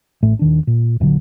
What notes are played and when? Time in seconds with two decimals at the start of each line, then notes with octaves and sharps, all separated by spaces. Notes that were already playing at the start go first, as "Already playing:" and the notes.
0.22 A1 A2 A3
0.39 D#1 D#3 D4
0.67 A#2
1.00 D#1 A#1 D3 F#3